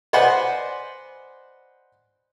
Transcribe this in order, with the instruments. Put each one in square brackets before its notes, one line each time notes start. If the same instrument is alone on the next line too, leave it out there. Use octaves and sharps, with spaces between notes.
[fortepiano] B4 C5 D5 D#5 F#5 G#5